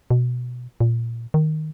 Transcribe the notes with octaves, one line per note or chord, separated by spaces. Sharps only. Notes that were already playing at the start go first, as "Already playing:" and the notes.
B2
A#2
D#3